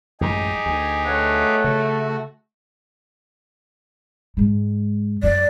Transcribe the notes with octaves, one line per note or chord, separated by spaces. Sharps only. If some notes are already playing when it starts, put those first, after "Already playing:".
A1 F#2 G#3 D#4 G4 G#4
D2 G#5
B2 A3 C#5 F#5
C#3 F#4
G#2 G#3
F#2 D5